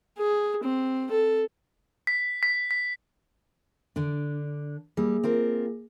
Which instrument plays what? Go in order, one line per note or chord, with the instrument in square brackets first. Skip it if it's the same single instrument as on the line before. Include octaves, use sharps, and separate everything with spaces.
[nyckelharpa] G#4
C4
A4
[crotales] B6
B6
B6
[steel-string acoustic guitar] D3 D4
[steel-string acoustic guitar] G3 [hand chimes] A#3 G#4
[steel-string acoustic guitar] C4 F4 A#4